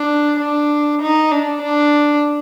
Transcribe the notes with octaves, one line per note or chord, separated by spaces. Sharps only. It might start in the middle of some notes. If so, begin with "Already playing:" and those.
Already playing: D4
D4
D#4
D4
D4